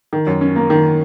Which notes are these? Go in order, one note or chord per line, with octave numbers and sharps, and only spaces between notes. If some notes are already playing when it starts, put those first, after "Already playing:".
D#3
F#2
C#4
A#3
D#3